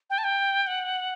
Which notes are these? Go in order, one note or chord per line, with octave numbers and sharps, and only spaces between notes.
G5
A5
G5
F#5